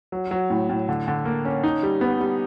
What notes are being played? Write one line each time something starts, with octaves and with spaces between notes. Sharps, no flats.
F#3
F#3
A2
A2
D3
D3
A#3
C#4
D#4
G3
B3
G3